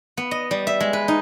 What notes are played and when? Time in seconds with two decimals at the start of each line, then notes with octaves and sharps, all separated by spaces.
0.17 B3
0.31 D#5
0.51 G3
0.67 E5
0.80 G#3
0.93 B4
1.08 D#4